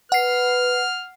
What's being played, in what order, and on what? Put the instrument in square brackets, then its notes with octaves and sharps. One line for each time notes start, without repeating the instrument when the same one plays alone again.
[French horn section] B4 [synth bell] F#5 C7 [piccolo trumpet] F6